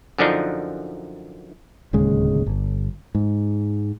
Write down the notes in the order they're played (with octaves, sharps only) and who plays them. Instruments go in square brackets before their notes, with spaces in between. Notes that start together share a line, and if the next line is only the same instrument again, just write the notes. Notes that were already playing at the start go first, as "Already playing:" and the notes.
[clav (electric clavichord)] F#2 D3 F3 D4 D#4
[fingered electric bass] D1 D#2 C#3 G#3
G1
G#2